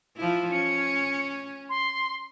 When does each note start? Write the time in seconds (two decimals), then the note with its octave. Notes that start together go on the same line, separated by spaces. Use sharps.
0.17 F3 E4
0.52 C#4 C#7
1.69 C6